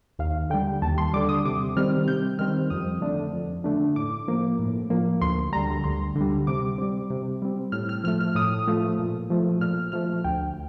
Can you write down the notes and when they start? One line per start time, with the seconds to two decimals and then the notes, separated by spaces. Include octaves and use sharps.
0.19 D#2 F5
0.50 D3 G3 G5
0.82 D#2 A5
0.98 C6
1.13 D3 G3 D6
1.29 D#6
1.45 C3 D6
1.76 D#3 G3 C4 F6
2.08 C3 G6
2.39 D#3 G3 C4 F6
2.70 F2 D#6
3.01 D3 A3 D4
3.33 F2
3.64 D3 A3 D4
3.96 A2 D6
4.28 F3 A#3
4.59 A2
4.90 F3 A#3
5.21 D2 C6
5.52 D3 G3 A#5
5.84 D2 C6
6.16 D3 G3
6.47 C3 D6
6.78 G3 C4
7.10 C3
7.42 G3 C4
7.72 A2 F6
7.89 F6
8.04 F3 F6
8.07 A3
8.21 F6
8.35 A2 D#6
8.67 F3 A3
8.99 A#2
9.30 F3 A3
9.61 A#2 F6
9.92 F3 A3 F6
10.24 D2 G5